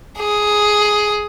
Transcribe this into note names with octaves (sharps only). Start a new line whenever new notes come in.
G#4